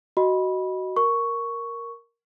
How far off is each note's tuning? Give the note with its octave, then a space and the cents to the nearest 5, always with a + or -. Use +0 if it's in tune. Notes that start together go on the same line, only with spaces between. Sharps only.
F#4 +15 D#5 +0 B5 -15
A#4 +0 C#6 +5